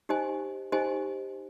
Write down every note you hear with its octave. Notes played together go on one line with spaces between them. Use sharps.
D#4 G4 C5 D#5 G#5
D#4 G4 C5 D#5 G#5